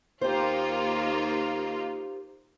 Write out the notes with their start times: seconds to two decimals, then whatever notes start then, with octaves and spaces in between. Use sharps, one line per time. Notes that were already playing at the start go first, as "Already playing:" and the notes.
0.21 D#2 A#3 D#4 F4 G4 C5